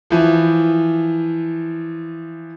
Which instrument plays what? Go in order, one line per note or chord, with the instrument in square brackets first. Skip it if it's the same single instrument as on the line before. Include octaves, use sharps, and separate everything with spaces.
[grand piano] E3 F3